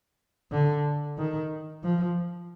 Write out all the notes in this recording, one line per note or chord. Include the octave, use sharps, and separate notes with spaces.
D3
D#3
F3